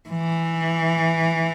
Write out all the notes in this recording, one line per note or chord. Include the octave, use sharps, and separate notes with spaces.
E3